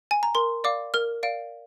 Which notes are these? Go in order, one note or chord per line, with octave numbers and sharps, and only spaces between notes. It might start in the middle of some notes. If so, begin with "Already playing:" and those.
G#5
A#5
A#4 C6
D5 F5 D6
A#4 F6
D5 F5 D7